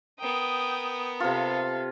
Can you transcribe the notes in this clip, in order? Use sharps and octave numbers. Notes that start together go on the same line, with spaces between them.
B3 A#4 G5 D#6
C3 F4 A4 F5